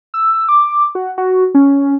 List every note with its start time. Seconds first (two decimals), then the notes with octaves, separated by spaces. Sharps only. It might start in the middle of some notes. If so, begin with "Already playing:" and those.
0.14 E6
0.49 D6
0.95 F#4
1.18 F#4
1.55 C#4